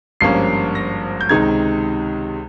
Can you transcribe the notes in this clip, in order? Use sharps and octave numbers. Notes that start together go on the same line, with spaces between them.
G#1 G2 F3 A#3 C#4 C7
A#6
G6
C#2 C3 D#3 G#3 D#4 G#6